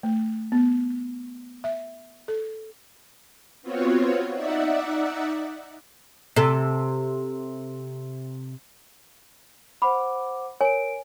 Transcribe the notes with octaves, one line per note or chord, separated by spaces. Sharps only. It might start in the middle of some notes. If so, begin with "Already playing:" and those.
A3
B3
E5
A4
B3 C4 F4 F#4 C#5
D#4 D5 E5 F#5
C3 A4
C5 F#5 B5 D6
A#4 C#5 G#5 D7